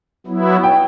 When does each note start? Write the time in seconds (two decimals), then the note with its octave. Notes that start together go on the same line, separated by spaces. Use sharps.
0.26 F#3 B3 E4
0.64 G5